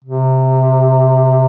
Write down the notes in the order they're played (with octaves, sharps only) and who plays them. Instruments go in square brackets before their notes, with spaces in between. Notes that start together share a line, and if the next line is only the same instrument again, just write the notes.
[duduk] C3